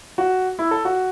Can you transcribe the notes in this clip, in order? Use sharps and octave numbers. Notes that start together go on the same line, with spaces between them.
F#4
E4
A4
F#4